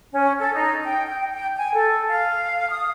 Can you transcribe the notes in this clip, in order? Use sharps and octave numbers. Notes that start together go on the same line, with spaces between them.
C#4
A4
D#4
G5
G5
G5
G#5
A4
F5
D#6